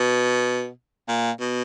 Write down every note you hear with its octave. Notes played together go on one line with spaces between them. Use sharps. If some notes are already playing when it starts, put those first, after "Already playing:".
Already playing: B2
A#2
B2